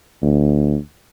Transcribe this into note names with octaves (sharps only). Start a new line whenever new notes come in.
D2